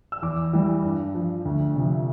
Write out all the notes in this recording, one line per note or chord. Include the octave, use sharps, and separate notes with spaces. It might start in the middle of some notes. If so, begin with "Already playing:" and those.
E6
E2 D6
E3 G3
G2
F3
D2
C3 F3